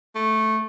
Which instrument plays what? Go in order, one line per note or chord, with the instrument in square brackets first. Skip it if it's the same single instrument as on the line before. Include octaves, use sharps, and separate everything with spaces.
[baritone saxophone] A3